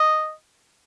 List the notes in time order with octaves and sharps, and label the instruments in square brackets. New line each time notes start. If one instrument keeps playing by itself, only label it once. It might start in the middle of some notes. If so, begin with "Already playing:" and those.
Already playing: [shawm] D#5